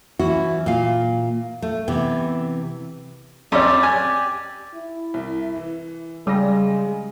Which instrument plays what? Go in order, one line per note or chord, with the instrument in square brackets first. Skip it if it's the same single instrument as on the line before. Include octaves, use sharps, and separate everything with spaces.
[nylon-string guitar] E3 C#4 E4 F#4
A#2 F5
A3
C3 E3 B3
[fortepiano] F2 C#4 [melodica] G4 D5
[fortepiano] G#5
[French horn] E4
[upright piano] C2
E3
[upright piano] C#3 A#6 [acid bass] G3 [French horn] G#3